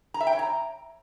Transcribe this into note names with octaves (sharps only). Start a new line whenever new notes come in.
A#5
E5
G5
C#5
A#5